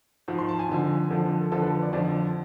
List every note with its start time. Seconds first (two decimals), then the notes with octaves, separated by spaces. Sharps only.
0.28 G#2 F3
0.39 C6
0.49 A5
0.59 G#5
0.69 F2 D3 F3
1.10 F2 D3 F3 A4
1.41 A4
1.52 F2 D3 F3 A4
1.62 B4
1.83 D5
1.93 F2 D3 F3 D5